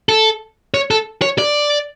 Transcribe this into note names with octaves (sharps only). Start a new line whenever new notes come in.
A4
C#5
A4
C#5
D5